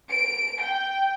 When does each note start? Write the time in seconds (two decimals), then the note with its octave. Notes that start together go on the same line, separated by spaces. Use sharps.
0.10 D7
0.61 G5